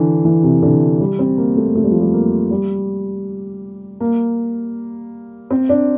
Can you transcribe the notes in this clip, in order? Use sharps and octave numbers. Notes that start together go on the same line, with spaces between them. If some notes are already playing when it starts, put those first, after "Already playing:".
Already playing: D3 E3
E3
C3
D3
G3
C4
A#3
A3
A3
G3
F3
G3
A#3
G3
A#3
C4
D4